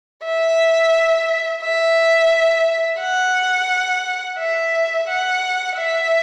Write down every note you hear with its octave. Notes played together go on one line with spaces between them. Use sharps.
E5
E5
F#5
E5
F#5
E5